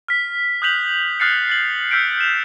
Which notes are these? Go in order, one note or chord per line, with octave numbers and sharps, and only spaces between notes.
F6 B6
D#6 F#6 G6 B6 F7 F#7
D#6 F6 F#6 A6 C7 C#7
A6 F#7
E6 F6 G6 B6 C#7 D7
E7 F7